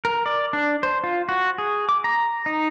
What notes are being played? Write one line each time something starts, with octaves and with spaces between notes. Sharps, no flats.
A#4
D5
D4
C5
F4
F#4
G#4
D6
A#5
D#4